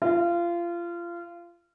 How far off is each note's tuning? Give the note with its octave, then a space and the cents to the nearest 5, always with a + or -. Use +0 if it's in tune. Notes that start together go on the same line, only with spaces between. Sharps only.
F4 -25